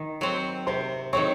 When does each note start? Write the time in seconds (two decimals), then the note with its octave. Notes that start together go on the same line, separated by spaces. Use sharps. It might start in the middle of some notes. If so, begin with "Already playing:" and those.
Already playing: D#3
0.21 F#3 C4
0.67 C3 C5 C6
1.13 D#3 F#3 C4 C#5 C#6